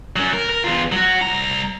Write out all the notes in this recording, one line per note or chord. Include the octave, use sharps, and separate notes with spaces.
F#3 C#4
A#4
A#4
E2 F4
F#3 F#4
C2 A#5